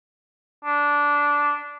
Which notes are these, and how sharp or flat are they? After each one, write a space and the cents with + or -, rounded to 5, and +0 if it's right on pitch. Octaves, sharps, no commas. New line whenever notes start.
D4 -10